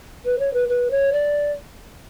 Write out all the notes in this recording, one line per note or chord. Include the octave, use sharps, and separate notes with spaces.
B4
C#5
B4
B4
C#5
D5